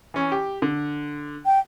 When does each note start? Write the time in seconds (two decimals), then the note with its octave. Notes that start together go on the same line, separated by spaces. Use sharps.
0.14 E3 C#4
0.32 G4
0.62 D3
1.46 G5